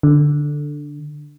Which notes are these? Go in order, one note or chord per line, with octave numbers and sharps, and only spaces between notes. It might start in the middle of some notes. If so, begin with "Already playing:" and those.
D3